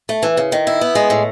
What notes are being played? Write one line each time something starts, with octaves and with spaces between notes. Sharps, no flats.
A3
E3
C#3
D#3
E4
B3
G#3
A2